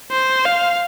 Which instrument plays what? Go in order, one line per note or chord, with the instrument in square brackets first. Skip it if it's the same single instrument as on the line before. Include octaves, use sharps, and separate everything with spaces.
[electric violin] C5
F5